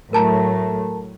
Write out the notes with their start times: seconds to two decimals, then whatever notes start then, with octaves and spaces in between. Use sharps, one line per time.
0.13 A2 F#3 A3 A#4 A5 A#5